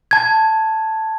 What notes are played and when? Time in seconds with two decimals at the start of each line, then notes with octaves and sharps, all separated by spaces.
0.11 A5 G#6